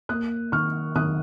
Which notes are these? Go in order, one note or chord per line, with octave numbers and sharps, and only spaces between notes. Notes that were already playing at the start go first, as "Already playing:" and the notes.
A#3 D#6 F#6
D#3 C#6 F6
D#3 D#6 F#6